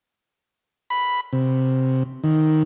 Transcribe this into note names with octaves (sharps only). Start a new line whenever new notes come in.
B5
C3
D#3